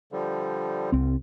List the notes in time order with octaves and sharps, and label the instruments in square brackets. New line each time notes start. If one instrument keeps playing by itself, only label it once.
[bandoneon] D3 F3 G3
[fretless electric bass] C2 C4